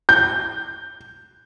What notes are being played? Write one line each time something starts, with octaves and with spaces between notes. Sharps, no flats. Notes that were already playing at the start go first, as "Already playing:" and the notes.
G6